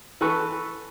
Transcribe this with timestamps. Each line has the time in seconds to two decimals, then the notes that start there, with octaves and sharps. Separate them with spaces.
0.21 E3 A4 B4 C#6